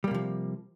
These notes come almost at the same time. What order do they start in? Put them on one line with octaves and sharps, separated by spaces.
G3 A#3 C3 F3